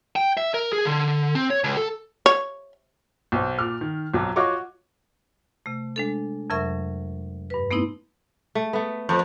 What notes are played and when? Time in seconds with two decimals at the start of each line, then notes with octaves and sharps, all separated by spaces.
0.16 G5
0.37 E5
0.54 A#4
0.73 G#4
0.85 D3
1.35 C4
1.50 C#5
1.64 C#2
1.77 A4
2.26 C#5
3.32 B1 C5
3.59 A#2 D6 F6
3.81 D#3
4.14 B1 F2 F#3 D6
4.36 F4 F#4 C#5 D#5 C#6 D6
5.66 C3 A3
5.96 G#3 D4 A4
6.50 F2 C3 F#3 A#4 E5 C#6
7.50 G2 B4
7.71 A3 B3 C4 D#4 E4
8.55 A3
8.73 A3 B3
9.09 F2